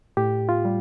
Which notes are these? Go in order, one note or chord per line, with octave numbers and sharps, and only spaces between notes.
A2 G4
F4
G3